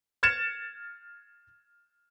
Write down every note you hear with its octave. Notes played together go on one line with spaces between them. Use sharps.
F6 G#6 A6 C#7 E7